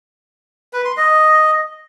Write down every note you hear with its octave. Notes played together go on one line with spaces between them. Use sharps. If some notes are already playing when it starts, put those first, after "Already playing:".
B4
C6
D#5